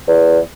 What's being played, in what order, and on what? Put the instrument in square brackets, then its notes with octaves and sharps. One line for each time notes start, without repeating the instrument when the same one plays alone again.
[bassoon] E2